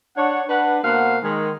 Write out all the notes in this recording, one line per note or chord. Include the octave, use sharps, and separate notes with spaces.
D4 C#5 F#5
D4 B4 F#5
B2 A#3 C5 F5 F#5
D#3 G#3